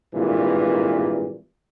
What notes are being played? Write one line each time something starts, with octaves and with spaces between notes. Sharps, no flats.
G#1 G2 A#2 E3